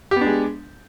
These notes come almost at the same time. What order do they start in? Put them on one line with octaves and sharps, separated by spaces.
G4 B3 D4 G#3